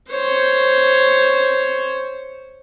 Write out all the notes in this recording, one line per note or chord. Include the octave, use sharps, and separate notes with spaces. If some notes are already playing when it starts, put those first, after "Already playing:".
C5 C#5